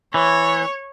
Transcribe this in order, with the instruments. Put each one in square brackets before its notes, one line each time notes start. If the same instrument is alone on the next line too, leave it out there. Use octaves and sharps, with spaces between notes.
[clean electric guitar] E3 [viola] C#5